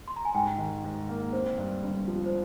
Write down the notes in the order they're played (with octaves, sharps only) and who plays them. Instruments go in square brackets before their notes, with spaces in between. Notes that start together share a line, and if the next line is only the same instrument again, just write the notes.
[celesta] C6
A#5
G#5
[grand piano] G#2 [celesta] G5
[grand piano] D#3
G#2
A#3
[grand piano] C4 [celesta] C5
[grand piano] G2
G1
F3
[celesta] C5